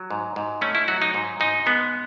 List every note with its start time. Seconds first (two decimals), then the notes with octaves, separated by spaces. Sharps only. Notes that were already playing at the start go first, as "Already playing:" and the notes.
Already playing: F#3
0.11 G#2
0.36 G#2
0.61 A3 C#4
0.75 E4
0.88 F#3 F#4
1.02 D#4
1.14 G#2
1.40 G#2 D#4
1.66 G#3 B3